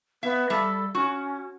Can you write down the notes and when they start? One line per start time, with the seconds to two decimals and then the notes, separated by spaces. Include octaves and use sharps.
0.23 B3 E5
0.50 G3 A4 E5
0.95 C#4 F#4